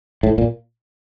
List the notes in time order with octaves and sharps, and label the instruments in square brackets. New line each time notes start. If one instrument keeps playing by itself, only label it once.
[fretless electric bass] A2
A#2